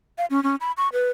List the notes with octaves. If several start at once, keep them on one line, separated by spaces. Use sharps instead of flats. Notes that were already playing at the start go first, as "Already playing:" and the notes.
F5
C#4
C#4
B5
C#6
B4